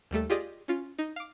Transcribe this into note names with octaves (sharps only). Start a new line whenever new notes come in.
D#2 G3 A3 A4
F4 G4 G#4 D5 D#5
C#4 F4
D#4
F5 D6